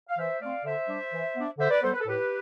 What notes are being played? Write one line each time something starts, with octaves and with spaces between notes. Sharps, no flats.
F5
E3 C5 E5
A3 C4 D5 F5
D3 C5 E5
G3 D4
E3
B3 D4
D3 C5 E5
B4 D5
G3 B3 A4 C5
B4
A4
A2 G4 B4